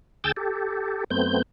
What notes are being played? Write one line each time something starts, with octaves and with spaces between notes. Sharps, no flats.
D2 G#4 G5 E6 G6 A6
G4 A4
F#2 A3 B3 C4 G6